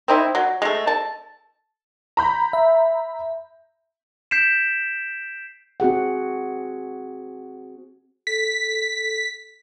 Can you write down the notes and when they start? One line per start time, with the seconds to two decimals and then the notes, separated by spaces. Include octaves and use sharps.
0.08 C4 D#4 E4
0.35 F#3
0.62 G#3 A3
0.87 A5
2.17 A#5 B5 G6
2.53 E5
4.31 G6 B6 C7 D7 E7
5.80 C4 F#4 G#4 F#5
8.27 A4 B6